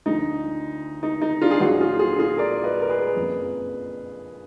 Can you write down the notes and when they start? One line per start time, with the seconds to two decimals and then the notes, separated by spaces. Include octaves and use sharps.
0.06 D2 D3 F3 D#4
1.03 D#4
1.21 D#4
1.42 D4 F4
1.51 G#4
1.60 A#1 A#2 F#3 D#4 F#4
1.81 F4 G#4
1.99 F4 G#4
2.19 F4 G#4
2.38 A#4 D5
2.64 B4 D#5
2.81 A#4
2.89 G#4 B4
3.16 F#1 F2 F3